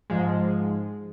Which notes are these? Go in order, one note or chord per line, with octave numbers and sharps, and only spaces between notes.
G#2 F3 G#3